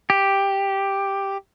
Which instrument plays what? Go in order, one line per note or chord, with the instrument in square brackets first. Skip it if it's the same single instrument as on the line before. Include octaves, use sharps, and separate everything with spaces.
[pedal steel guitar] G4